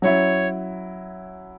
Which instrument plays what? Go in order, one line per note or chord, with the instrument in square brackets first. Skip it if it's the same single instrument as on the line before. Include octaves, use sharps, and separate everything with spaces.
[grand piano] F#3 C#4 E4 [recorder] C#5